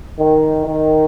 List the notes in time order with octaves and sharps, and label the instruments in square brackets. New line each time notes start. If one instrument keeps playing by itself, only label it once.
[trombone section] D#3
D#3